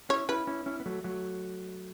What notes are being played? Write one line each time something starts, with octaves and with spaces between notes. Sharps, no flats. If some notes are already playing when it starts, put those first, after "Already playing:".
C#4 E4 C#5
C#4 E4 B4
C#4 E4
C#4 E4
B3
F#3 A3
F#3 A3